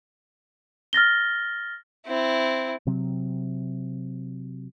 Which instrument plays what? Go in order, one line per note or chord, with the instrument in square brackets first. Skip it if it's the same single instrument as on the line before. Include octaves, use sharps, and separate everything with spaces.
[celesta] F6 A6 A#6 G7
[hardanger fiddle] C4 E4
[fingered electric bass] C3 F#3 C4